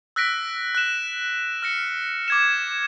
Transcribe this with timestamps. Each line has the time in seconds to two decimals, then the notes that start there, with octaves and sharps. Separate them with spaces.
0.16 E6 F#6 A#6 B6 D7
0.75 F#6 E7
1.62 F6 A#6 C#7
2.28 D6 G#6 E7